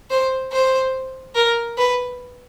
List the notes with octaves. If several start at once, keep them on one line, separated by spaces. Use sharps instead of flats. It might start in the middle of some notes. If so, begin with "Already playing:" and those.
C5
C5
A#4
B4